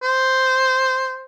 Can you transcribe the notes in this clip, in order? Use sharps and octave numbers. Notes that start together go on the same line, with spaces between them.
C5